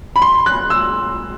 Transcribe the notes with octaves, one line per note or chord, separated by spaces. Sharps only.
B5
C6
F#6
E6